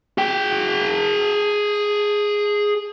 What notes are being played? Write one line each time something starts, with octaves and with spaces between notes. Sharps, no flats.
G#4 G5